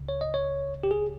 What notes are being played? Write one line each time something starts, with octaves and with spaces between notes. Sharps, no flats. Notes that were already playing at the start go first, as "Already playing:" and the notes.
Already playing: C#2 C#3
C#5
D#5
C#5
G4
G#4